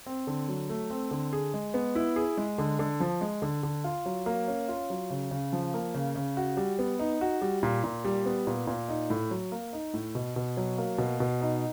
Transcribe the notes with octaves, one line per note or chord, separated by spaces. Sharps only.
C4
D3
F#3
A3
C4
D3
G#4
G#3
B3
E4
G#4
G#3
D3
D3
F3
G#3
D3
D3
F4
F#3
A#3
C#4
F4
F#3
C#3
C#3
F3
A#3
C#3
C#3
F#4
G3
B3
D#4
F#4
G3
A#2
A#2
G3
B3
A#2
A#2
D#4
A2
F#3
A#3
D#4
A2
B2
B2
F#3
A#3
B2
B2
D#4